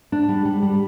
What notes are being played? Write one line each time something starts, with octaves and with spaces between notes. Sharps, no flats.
D4
G3
G3
G3